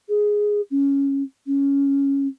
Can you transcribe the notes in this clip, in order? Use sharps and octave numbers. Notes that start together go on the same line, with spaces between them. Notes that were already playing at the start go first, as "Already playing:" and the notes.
G#4
C#4
C#4